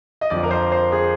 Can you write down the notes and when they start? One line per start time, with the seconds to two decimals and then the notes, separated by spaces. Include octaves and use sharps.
0.21 D#5
0.30 F2 D3 F3 D5
0.43 A#4
0.51 C5
0.72 C5
0.92 G#4